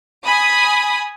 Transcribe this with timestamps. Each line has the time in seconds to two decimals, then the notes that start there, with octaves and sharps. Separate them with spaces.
0.24 G#5 B5 D#6